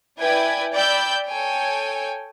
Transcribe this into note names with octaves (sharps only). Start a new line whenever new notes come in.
E4 B4 D5 G5 G#5 G#6
D5 G5 B5 E6 G6
A4 C#5 G5 G#5